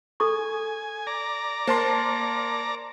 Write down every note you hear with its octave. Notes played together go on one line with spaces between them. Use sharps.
A4 G#5 C#6
D5 A#5
A#3 C5 A5 C6